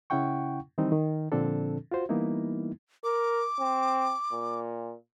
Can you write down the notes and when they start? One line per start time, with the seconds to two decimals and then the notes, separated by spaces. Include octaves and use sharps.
0.10 C#3 C#4 E4 F#5 G5 C#6
0.78 D#3 E3 G3 C4 D#4
0.92 D#3
1.32 A#2 D3 F3 C4 D4 A4
1.91 F4 F#4 C5
2.09 E3 G3 A#3 B3 D#4 E4
3.04 A#4 D6
3.60 C4
4.32 A#2